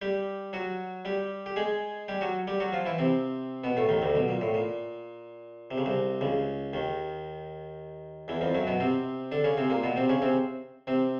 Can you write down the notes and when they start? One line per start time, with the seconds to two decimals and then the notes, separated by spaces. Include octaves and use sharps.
0.02 G3 G4
0.53 F#3 F#4
1.05 G3 G4
1.46 G4
1.56 G#3 G#4
2.08 G3 G4
2.21 F#3 F#4
2.47 G3 G4
2.60 F#3 F#4
2.72 F3 F4
2.86 E3 E4
2.98 C3 C4
3.64 B2 B3
3.77 A2 A3
3.89 D#2 D#3
4.02 D2 D3
4.15 B1 B2
4.28 A#2
4.41 A2
4.54 A#2
5.71 C3
5.78 C#3
5.86 C2 C3
6.21 C#2 C#3
6.73 D#2 D#3
8.28 E2 E3
8.41 F2 F3
8.54 F#2 F#3
8.67 B2 B3
8.80 C3 C4
9.32 D3 D4
9.44 C#3 C#4
9.57 C3 C4
9.70 A#2 A#3
9.83 B2 B3
9.96 C3 C4
10.09 C#3 C#4
10.22 C3 C4
10.87 C3 C4